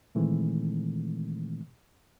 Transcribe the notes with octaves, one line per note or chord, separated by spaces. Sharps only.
A#2 D#3 E3 G#3 A3 C4